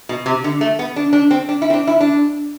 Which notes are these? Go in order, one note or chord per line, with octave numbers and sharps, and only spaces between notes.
B2
C3
D3
A3
B3
D4
D4
C4
D4
E4
C4
D4
E4
D4